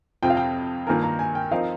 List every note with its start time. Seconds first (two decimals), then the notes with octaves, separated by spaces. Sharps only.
0.23 F2 C3 F3 C4 F4 G5
0.30 F5
0.37 G5
0.87 G2 D#3 A#3 F4 A#4 G#5
1.03 A#5
1.19 G#5
1.35 G5
1.51 F3 C4 D#4 A#4 F5